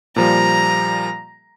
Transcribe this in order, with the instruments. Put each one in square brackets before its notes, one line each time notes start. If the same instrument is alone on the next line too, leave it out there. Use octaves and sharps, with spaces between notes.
[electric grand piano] A#2 F3 G3 [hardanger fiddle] A#5